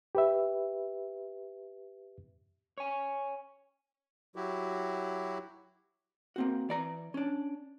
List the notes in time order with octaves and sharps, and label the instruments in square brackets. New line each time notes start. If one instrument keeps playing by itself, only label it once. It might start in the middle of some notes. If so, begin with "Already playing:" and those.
[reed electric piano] G4 B4 E5
[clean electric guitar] C#5 G#5
[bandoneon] F#3 E4 F#4 G4
[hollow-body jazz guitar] A#3 C4 F#4
E3 D5 A#5
C#4 D4